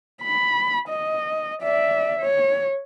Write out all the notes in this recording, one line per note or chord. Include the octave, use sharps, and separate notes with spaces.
B5
D#5
D5 E5
C#5